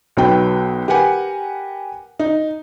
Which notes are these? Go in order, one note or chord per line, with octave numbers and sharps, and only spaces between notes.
B1 F#3 B3 G5
G4 A#4 B4 F#5 G#5
D#4